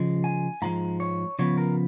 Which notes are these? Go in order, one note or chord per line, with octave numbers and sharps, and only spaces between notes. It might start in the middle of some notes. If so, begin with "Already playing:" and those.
Already playing: C#3 F3 G#3
G#5
G#2 F3 G#3 A#5
C#5
C#3 F3 B3 C#5
A#4